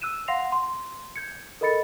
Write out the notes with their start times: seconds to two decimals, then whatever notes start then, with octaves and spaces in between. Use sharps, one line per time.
0.02 E6 F#6 D#7 E7
0.28 F5 F#5 C6 A#6 C7 F7
0.52 C6
1.16 G6 G#6 C#7
1.61 A4 A#4 D#5 B5 A6 C#7